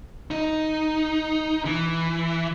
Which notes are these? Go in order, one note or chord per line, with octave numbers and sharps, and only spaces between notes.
D#4
E3